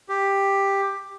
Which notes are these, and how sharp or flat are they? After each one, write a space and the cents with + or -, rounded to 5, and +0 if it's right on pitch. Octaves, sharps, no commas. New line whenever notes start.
G4 +10